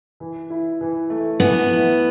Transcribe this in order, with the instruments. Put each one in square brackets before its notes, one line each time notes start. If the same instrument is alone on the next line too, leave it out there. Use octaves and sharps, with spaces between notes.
[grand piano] E3
E4
E3
A3
[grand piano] E3 [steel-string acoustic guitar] B3
[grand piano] E4